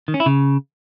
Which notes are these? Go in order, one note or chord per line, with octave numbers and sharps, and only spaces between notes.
D#3
C#4
E4
C#3